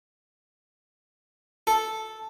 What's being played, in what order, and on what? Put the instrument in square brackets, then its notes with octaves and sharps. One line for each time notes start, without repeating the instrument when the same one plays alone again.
[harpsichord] A4